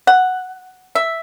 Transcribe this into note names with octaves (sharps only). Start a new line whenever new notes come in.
F#5
E5